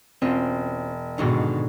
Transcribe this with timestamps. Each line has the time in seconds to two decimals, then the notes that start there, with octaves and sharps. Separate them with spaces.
0.22 E1 C4 C#4 F4
1.18 G#2 B2 D3 D#3 F#4